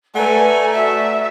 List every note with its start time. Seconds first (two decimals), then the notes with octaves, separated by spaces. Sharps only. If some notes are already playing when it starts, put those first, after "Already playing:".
0.15 A3 A4 B4 D5 F#5 G#5 A#5
0.74 F#4 D5 E5